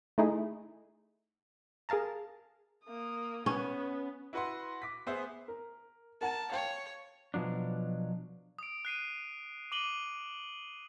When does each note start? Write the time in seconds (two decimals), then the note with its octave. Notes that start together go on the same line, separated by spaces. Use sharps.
0.18 A3 D#4 E4 G#4
1.89 G#4 A#4 F5 A5 A#5
2.85 A#3 D#6
3.46 B3 C#4
4.33 E4 F#4 B4 F#5 C6
4.82 D6 B6
5.07 B3 G#4 C5 E5
5.48 A#4
6.21 A#4 F#5 A5
6.52 C#5 F5 G5
7.34 B2 F3 F#3 D4
8.59 D#6 D7
8.85 F#6 C7 D#7
9.72 D6 D#7 F#7 G7